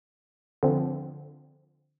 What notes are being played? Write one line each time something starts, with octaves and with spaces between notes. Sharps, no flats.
D3 F3 C4